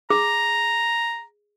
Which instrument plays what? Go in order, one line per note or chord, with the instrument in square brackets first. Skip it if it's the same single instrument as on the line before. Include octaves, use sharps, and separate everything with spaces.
[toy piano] G#4 [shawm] A#5